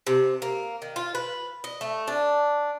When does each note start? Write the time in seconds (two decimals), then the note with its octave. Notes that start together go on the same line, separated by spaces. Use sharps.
0.07 C3
0.42 A#3
0.82 D#3
0.96 F4
1.15 B4
1.64 D#5
1.81 A3
2.08 D4